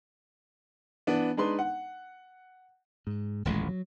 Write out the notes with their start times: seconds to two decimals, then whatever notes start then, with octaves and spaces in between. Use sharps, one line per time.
1.07 E3 B3 D4
1.37 G#3 D4 D#4 B4 C6
1.59 F#5
3.07 G#2
3.45 D#1 A1 F2 G#3
3.69 F#3